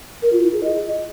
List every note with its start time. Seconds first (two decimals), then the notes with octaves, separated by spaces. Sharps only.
0.22 A#4
0.33 F4
0.43 E4
0.53 G#4
0.63 D#5